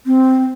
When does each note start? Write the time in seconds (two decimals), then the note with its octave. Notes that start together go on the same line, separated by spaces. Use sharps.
0.06 C4